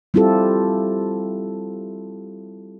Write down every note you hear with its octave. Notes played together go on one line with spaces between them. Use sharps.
G3 C4 E4 F4 G4 A4